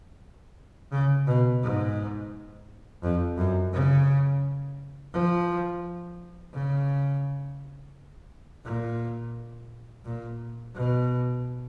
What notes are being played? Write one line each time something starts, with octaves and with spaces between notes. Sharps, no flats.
C#3
B2
G#2
F2
F#2
C#3
F3
C#3
A#2
A#2
B2